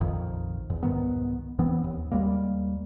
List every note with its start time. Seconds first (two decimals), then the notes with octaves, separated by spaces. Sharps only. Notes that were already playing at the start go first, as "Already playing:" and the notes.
0.01 A#1 F2 D#3
0.70 E2
0.83 C2 G#2 D#3 B3
1.59 E2 E3 B3 C4
1.84 D#2
2.12 D#2 G3 G#3 A#3